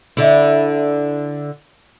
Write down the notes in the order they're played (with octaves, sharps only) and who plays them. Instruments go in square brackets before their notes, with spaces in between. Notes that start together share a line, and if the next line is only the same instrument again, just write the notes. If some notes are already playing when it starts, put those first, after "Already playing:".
[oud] D3 E4